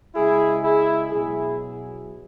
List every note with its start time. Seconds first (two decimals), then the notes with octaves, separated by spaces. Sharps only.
0.15 C#3 G#3 E4 G#4
0.64 E4 G#4
1.12 B2 F#3 E4 G#4